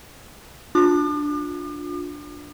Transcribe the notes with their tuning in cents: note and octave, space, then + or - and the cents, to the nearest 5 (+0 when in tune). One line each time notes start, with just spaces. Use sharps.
D4 +0 F4 +30 D6 +45